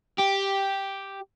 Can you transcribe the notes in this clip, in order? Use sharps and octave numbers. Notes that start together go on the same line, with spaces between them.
G4